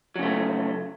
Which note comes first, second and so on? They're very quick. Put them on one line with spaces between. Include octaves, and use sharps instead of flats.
F#3 C#3 A3